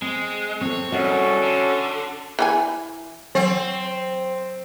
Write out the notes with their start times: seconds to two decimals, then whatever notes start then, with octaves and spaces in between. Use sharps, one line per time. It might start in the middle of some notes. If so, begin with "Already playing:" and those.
0.02 G#3 C4
0.61 C4 A4 C#5
0.92 C2 C#4 F#4 A4 D#5
1.43 D3
2.39 E3 E4 G#5
3.35 F#3 C4